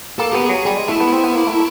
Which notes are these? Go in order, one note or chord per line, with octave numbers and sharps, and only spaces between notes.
A#3 A4
B3 G4
G#4
F#3
G3 G#4
G#3
A3 E4
B3
C4
B3
A#3
A3